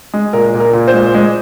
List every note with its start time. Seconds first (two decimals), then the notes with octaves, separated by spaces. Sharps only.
0.13 G#3
0.33 A#2 A#4
0.54 A#2
0.60 A#4
0.73 A#2
0.88 C5
0.93 G#3
1.14 G#3